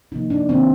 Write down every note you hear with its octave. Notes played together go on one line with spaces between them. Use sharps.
C3 F3 A#3 D#4
D4
C3 D#3 A#3 C4